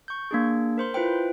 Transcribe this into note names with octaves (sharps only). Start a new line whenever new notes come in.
C#6 G6
A#3 D4 G#4
A#4 C5 C6
E4 F4 B4 C5 G5